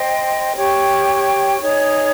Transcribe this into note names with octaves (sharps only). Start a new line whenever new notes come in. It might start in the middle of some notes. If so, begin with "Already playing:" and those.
Already playing: C5 D#5 G5 C6
G4 C#5 G5 C#6
D#4 G#4 C#5